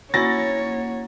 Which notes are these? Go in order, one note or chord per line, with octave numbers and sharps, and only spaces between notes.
A#3 C#4 E4 F#4 C#5 F#5 A6 A#6